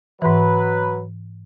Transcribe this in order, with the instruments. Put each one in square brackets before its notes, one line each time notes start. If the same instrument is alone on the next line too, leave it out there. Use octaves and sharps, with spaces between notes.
[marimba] G#2 E3 [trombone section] F#3 B4